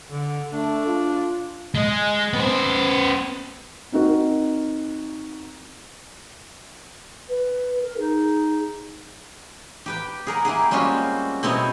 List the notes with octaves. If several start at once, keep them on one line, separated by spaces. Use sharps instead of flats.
D3
A3 D4
F4
G#3
B3 C5
C4 D#4 F#4 A#4
B4
A#4
D#4 G#4
G4 B4 G5
G#4 A#4 F#5
A#3 E4 G4 G#4
G3 G#3 C4 C#4 F4 F#4
B2 B3 C4 E4 C#5 D#5